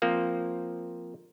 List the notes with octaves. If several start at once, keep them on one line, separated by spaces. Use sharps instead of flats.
F3 A#3 C4